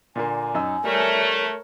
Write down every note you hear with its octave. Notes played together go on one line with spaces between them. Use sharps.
A#2 D3 A#3 G#5
F#2 D#4 E6
G3 A3 A#4 C#5